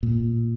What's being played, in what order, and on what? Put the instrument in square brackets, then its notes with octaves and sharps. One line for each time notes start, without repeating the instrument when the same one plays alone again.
[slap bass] A#2